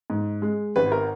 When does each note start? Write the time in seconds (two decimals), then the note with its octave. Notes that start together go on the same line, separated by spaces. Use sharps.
0.10 G#2
0.42 G#3
0.76 G#1 B4
0.92 A#4